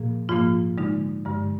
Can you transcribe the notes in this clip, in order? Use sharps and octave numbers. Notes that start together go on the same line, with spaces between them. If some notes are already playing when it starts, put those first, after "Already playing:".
Already playing: A#2 F3 A#3 G#4
G#2 F3 A#3 F4
D3 G#3 D#4
G2 D3 G#3